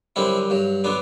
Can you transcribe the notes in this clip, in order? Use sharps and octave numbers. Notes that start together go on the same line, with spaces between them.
F#2 D3 G3 C4 E4
G2 F#3
D3 F#3 B3 D4